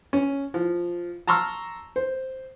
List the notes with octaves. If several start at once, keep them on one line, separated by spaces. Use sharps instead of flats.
C#4
F3
A5 A#5 C6 C#6 E6 F6
C5